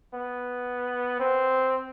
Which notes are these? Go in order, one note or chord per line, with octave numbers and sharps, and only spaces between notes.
B3
C4